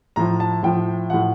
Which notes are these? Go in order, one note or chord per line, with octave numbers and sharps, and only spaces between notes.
A2 F3 A#5
A5
A2 F3 G5
A2 F3 F#5